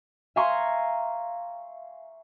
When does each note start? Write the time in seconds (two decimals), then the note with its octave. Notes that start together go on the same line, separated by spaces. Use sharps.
0.36 E5 F5 G#5 A#5 C6 C#6